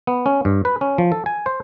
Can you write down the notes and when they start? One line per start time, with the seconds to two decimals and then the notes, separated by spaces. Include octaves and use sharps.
0.07 B3
0.26 C#4
0.45 G2
0.65 B4
0.81 C#4
0.98 F3
1.12 A4
1.26 G#5
1.46 C5